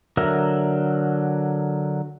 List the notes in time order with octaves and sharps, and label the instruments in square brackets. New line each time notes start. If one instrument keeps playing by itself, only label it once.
[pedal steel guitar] D3 F#3 A#4 E5